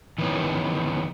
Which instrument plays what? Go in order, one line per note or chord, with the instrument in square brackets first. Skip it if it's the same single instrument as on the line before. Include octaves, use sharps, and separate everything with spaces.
[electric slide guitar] D#3 E3 B3 C#4